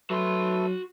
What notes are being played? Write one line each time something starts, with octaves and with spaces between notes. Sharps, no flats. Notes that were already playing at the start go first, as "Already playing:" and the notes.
F#3 A3 F#4 A4 B4 C6